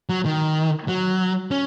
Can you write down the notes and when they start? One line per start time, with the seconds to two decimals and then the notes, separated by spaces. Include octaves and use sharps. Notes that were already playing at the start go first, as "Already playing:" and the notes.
0.09 F#3
0.25 D#3
0.88 F#3
1.51 C#4